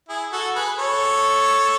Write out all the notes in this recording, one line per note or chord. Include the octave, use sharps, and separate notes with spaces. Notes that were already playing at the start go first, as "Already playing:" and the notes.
E4 G#4
F#4 A4
G#4 B4
A4 C#5